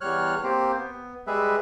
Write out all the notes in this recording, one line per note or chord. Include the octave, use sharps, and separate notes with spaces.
E2 G3 C#5 F6 F#6
A#3 C4 G4 C5
B3
G3 G#3 G#4 B4 E5